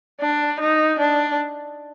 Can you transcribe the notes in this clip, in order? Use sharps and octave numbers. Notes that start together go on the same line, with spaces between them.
D4
D#4
D4